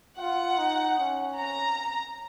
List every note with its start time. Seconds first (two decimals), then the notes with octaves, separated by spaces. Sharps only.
0.18 F4 F#5
0.58 D#4
0.99 C#4
1.39 A#5